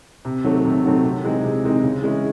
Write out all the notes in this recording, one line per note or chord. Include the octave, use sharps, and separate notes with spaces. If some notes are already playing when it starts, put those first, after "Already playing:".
C3
D#3 F#3 A3 C4
C3
D#3 F#3 A3 C4
C3
E3 G#3 C4 D#4
C3
E3 G#3 C4 D#4
C#3
E3 G#3 C#4 E4